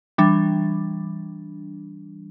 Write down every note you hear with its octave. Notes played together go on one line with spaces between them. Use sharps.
E3 G3 D4